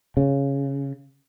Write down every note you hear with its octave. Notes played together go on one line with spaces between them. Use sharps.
C#3